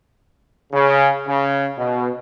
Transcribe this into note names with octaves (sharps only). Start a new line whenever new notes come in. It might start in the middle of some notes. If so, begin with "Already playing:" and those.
C#3
C#3
B2